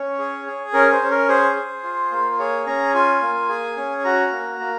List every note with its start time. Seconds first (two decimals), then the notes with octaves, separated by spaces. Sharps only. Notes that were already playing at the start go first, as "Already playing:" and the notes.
Already playing: C#4 C#5
0.18 G#4
0.46 G#4
0.73 C#4 A#4
0.92 C5
1.02 C#4
1.11 A#4
1.28 G#4 C5
1.56 G#4
1.83 F4
2.12 A#3
2.39 G#4 C#5
2.66 C#4 A#5
2.94 F4 G#5
3.22 A#3
3.49 G#4
3.77 C#4
4.05 F#4 A#5
4.32 A#3
4.60 A#3